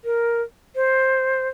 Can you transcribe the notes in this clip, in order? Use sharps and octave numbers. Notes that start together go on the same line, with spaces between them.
A#4
C5